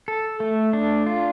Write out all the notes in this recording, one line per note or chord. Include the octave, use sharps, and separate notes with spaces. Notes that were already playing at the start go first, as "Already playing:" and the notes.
A4
A3
D4
F4